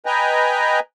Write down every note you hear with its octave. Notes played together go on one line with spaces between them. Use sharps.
B4 D#5 G5 G#5 A#5